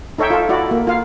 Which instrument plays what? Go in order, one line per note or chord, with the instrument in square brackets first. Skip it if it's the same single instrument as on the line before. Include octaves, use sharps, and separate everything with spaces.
[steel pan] D#4 A4 C#5 E5 G5
F4 A4
E4 F#4 D5
A#3
F4 F5